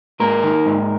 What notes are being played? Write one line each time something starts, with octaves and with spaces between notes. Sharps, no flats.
G#2 A#3 A#4
D#3
G#2